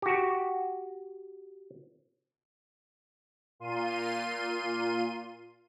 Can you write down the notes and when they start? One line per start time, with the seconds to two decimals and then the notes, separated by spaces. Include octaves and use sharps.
0.02 F#4 G4
3.60 A#2 F4 C6 D#7